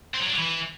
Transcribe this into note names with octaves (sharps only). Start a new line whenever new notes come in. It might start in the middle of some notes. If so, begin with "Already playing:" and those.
C4
F#3
D4
F#3
E3